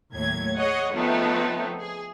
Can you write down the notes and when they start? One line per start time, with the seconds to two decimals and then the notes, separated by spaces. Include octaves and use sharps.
0.12 D#2 A2 F#3 G#6
0.56 G#4 C#5 D#5 F#5
0.92 C#3 F3 A3 B3 C4 D#4
1.80 G#4